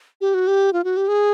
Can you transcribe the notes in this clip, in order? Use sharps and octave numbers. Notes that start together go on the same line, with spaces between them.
G4
F#4
G4
F4
F#4
G4
G#4